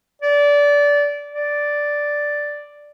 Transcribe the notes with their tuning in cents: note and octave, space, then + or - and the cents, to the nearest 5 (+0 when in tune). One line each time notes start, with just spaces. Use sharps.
D5 -20
D5 +0